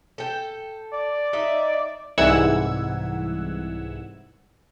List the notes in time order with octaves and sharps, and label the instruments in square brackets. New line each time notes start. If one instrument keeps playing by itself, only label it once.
[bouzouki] A4 G5
[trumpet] D5
[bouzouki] D#4 D#5 E5
[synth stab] C2 G#2 E3 F#5 E6 G#6